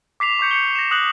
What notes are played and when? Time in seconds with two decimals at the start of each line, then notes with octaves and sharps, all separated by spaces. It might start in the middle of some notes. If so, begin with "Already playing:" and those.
0.20 D6 B6 C7 F7
0.39 C#6 D6 G6 C#7
0.51 G6 C#7 G7
0.75 A#6 E7
0.91 D#6 F#6 A#6 F#7